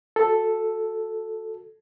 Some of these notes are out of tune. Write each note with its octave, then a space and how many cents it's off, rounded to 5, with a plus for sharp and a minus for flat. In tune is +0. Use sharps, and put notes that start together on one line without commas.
F#4 -25 A4 +0